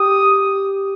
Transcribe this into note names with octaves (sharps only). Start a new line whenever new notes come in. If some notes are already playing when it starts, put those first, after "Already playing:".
Already playing: G4 D#6